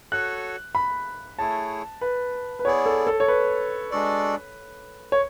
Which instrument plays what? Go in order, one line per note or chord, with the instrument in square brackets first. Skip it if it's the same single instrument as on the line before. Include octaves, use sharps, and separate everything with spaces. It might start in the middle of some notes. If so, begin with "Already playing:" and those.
[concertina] F#4 A4 C#5 [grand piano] F#6
[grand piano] B5
[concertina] A3 E4 G#4 C#5 [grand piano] A5
[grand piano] B4
B4
[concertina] B3 E4 G#4 D5 [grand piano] C#5
[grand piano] A4
A4
C#5
B4
[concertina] G#3 D4 F#4 A4 D5
[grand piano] C#5